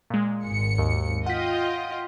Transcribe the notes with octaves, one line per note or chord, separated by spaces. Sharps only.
A#2 G#3
G#1 C#7
D#2
F4 D#5 F#5 G5 B6